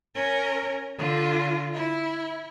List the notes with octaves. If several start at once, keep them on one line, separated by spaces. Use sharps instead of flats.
C#4 A#4
D3 F4
E4